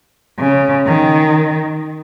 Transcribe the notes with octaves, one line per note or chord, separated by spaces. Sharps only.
C#3
D#3